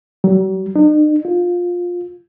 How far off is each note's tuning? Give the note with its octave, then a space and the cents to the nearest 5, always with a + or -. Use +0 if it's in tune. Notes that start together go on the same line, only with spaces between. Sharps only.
F#3 +45
D#4 -45
F4 +15